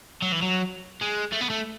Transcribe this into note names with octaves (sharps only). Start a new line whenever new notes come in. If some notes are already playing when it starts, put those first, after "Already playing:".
F#3
E3
F#3
G#3
A3
B3
A3